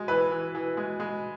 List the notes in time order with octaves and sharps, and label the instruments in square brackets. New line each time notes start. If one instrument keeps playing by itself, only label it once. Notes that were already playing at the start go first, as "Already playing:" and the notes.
Already playing: [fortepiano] G#3
[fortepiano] E3 [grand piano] B4
[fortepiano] E3
E3
G#3
G#3